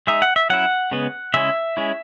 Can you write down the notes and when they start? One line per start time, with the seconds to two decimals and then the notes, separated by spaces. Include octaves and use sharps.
0.07 G#3 D#4 E5
0.22 F#5
0.36 E5
0.50 F#3 C#4 E4 F#5
0.91 C#3 G#3 B3
1.34 C#3 G#3 C#4 E4 E5
1.77 G#3 C#4 E4